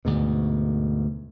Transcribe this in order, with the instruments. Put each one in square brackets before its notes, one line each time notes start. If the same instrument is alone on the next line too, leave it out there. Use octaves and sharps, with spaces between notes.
[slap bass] D2 G#2 B2